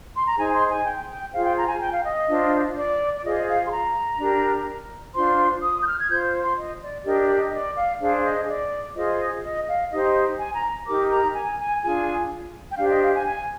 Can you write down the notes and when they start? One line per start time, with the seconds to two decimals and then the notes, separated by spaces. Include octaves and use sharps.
0.15 C6
0.27 A#5
0.37 D#4 G#4 C5 G#5
0.53 C6
0.69 G#5
0.84 G5
1.09 G5
1.32 F4 G#4 C5 F5
1.45 G5
1.56 A#5
1.68 G#5
1.80 G5
1.92 F5
2.04 D#5
2.28 D4 F4 C5
2.75 D5
3.15 D5
3.23 F4 G#4 C5 D#5
3.47 F5
3.65 C6
3.70 A#5
4.19 D4 G4 A#4
5.14 D4 F4 C5 C6
5.61 D#6
5.81 G6
5.86 F6
5.99 G#6
6.09 F4 C5 G6
6.41 C6
6.57 D#5
6.81 D5
7.05 D4 G4 A#4 D#5
7.20 D5
7.37 D#5
7.53 D5
7.76 F5
8.00 D4 G#4 C5 F5
8.24 D#5
8.48 D5
8.95 F4 G#4 C5 D#5
9.43 D#5
9.67 F5
9.91 D#4 G4 C5 D#5
10.38 G#5
10.55 A#5
10.86 D#4 G4 A#4 D6
11.10 A#5
11.34 G#5
11.58 G#5
11.81 D4 F4 G#4 G#5
12.69 G5
12.77 D4 G4 C5 F5
12.89 D#5
13.01 F5
13.13 G#5
13.25 G#5